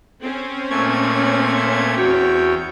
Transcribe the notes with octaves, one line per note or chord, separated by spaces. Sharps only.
C4 C#4
A#2 A3 C#6 G#6
C#5
E2 F#4 C#5 G5